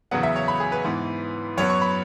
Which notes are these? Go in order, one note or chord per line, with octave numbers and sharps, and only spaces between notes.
E2 C#3 F#3 B3 F#5
E5
C#5
B5
G#4
B4
G#2 E3 B3
F#2 F#3 B3 C#5
C#6
B5